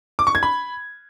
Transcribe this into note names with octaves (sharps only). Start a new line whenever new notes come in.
D6
C#6
G#6
B5